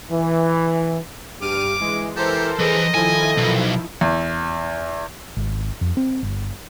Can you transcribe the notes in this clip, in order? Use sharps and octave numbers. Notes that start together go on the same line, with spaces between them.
E3
G2 G4 D6 F6 D#7
E3 G#3
E3 G4 A4 A#4 C5
E3 G#4 D#5
D#3 F3 E4 A4 G#5
B1
E2
G#1
F2
C4
G1